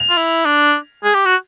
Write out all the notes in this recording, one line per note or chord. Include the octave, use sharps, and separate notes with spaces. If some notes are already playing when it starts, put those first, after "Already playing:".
Already playing: F7
F4
E4
D4
G#4
G4
F#4